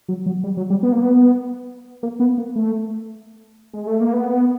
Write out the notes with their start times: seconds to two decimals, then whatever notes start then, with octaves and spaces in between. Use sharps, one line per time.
0.09 F#3
0.26 F#3
0.44 G3
0.57 F#3
0.70 G3
0.83 B3
0.92 A#3
1.02 B3
2.03 A#3
2.20 B3
2.38 A#3
2.56 A3
3.74 G#3
3.87 A3
4.01 A#3
4.13 B3